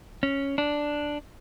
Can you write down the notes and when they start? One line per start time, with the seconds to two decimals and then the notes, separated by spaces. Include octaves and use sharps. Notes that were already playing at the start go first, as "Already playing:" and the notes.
0.23 C#4
0.58 D4